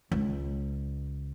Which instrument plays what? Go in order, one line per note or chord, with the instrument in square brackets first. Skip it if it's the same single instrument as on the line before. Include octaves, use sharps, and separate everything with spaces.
[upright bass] C#2